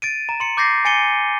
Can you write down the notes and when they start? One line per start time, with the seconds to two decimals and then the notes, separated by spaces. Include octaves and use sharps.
0.02 A6 D7 D#7
0.29 A#5
0.40 C6 C#7
0.57 D6 G6 A6 A#6 C7
0.85 G#5 A6 C#7 D#7 G7